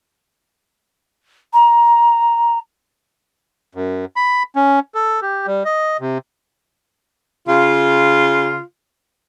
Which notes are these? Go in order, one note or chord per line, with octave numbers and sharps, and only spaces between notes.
A#5
F#2
B5
C#4
A4
G4
G3
D#5
C3
C#3 F4